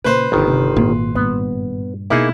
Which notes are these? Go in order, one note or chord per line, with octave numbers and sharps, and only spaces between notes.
A#2 C#3 B4 C5
G1 B2 D#3 C4
C3
G#1 A#2
G2 A#2 B3
B2 A#3 D#4 E4 G#4